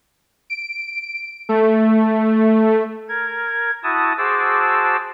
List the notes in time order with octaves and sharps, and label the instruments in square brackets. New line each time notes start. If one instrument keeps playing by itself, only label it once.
[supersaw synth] D7
A3
[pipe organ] A#4 G#6
E4 F#4 A5 D#6
F#4 G#4 C5 A5 D6 E6